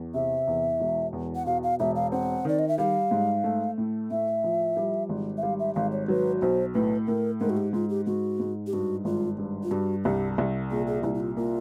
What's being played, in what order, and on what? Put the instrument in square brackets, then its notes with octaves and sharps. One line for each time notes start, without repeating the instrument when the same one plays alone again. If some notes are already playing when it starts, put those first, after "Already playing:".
Already playing: [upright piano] E2
[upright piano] C3 [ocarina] E5
[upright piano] E2
E1
E2
[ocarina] F#5
[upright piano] B2 [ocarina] F5
[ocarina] F5
[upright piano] E1 [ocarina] E5
[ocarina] F5
[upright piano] C4 [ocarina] F#5
[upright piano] D#3 [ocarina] D5
[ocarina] D#5
E5
[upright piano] G3 [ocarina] F5
[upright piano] G#2
A3
A2
[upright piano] A2 [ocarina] E5
[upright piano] F3
G3
G#1
[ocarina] E5
[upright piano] G3 [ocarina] F5
[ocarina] E5
[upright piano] G#1 [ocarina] F5
[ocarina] C#5
[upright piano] F#3 [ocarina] B4
[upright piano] B1 [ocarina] C5
[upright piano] A2 [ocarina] B4
[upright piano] A2 [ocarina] A#4
[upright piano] G#2 [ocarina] A#4
[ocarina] F#4
G4
[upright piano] G#2 [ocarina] F4
[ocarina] G4
[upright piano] G#2 [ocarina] F#4
[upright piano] G#2
[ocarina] G4
[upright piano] G2 [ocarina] F#4
[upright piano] G#1 [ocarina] F4
[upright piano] G2
[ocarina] F4
[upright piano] G2 [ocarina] F#4
[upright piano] C2 [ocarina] G4
[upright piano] C2
[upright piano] A#2 [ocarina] G#4
[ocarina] G#4
[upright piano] C2 [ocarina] E4
[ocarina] E4
F4
[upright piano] A#3 [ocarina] F4